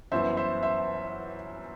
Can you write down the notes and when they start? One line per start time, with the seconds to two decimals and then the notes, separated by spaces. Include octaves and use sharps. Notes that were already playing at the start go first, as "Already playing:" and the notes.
0.11 G1 F#2 E3 C5 E5
0.37 C5 E5
0.63 C5 E5